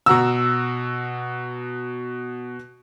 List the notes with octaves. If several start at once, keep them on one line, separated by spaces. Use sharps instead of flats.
B2 F#4 A#5 E6